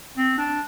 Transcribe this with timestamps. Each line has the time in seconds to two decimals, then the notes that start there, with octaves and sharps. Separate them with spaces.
0.17 C4
0.38 D4